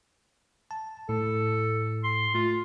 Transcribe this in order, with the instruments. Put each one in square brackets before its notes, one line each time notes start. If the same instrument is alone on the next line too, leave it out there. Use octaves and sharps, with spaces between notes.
[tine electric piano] A5
[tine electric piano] A2 [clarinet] A4
[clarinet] C6
[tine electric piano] A3 [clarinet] F4